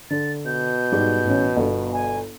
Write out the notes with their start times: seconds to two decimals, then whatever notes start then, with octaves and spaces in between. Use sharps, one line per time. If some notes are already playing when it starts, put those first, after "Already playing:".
0.10 D3 A6
0.46 B2 G6
0.92 G#2 G3 G4
1.25 A1 C#4
1.56 G1
1.93 G#5